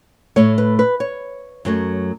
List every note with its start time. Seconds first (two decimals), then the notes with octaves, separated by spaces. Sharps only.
0.36 A2 A3 C#5
0.58 B4
0.79 B4
1.00 C#5
1.65 F#2 F#3 A3